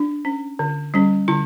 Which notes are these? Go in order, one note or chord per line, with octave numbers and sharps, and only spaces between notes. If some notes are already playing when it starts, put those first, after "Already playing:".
Already playing: D4
C#4
D3
G3 C#4
D3 E4